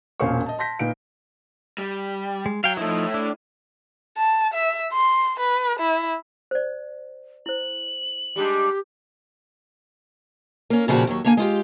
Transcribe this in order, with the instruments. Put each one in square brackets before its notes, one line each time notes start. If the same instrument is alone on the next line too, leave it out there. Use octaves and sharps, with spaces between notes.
[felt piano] E1 A#2 C#4 C5 F5 C#6
D#5 A5
A5 C6 G6 A#6 B6
A#2 D#4 B4 F5 D7
[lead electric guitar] G3
[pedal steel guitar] G#3
[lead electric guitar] F#3 [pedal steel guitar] F5 G5
[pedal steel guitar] F3 D#4 [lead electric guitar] A3 E4
[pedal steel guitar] D4
[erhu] A5
E5
C6
B4
E4
[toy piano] C5 D5
[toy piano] E4 C5 [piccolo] F#7
[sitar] G3 G#3 D4 [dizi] G4
[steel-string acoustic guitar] A#3 C#4
A#2 C#3 F3 D#4 F#4 G4
D#2 F#3
D3 A#3 G#5
G#3 F4 G4